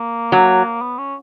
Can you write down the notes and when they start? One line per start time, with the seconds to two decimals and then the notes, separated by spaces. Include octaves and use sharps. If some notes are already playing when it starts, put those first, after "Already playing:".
Already playing: A#3
0.32 F#3
0.81 B3
0.98 C#4